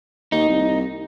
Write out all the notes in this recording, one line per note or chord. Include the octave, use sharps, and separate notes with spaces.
D#2 D#4
C2